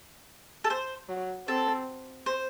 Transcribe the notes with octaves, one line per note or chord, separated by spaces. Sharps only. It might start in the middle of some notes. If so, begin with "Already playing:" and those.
A4
C5
F#3
C4 A4
C5